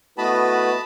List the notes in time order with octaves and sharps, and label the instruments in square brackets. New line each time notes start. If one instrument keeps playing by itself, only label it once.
[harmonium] A3 E4 B4 [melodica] B3 D#5 [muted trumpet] F#4 [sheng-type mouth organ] A5 B5